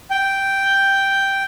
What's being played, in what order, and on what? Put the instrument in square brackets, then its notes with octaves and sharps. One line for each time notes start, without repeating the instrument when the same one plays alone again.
[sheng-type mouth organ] G5